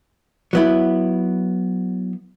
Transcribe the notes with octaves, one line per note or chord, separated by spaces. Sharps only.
F#3 B3 E4